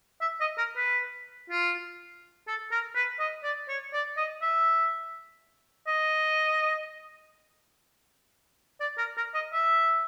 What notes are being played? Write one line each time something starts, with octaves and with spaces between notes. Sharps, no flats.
E5
D#5
A#4
B4
F4
A4
A#4
B4
D#5
D5
C#5
D5
D#5
E5
D#5
D5
A#4
A#4
D#5
E5